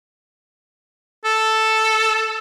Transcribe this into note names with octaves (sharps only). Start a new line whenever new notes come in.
A4